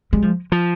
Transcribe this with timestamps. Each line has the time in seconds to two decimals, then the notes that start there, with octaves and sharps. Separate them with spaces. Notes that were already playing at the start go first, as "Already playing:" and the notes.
0.13 G3 G#3
0.22 F3
0.52 F3